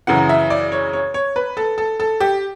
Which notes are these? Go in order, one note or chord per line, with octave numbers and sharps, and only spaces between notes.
F#2 C#3 E3 F#5
E5
D5
C#5
C#5
C#5
B4
A4
A4
A4
G4